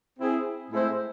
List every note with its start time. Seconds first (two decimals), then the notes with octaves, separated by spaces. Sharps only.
0.19 C4 E4 G#4
0.70 A2 G#3 C4 E4 C5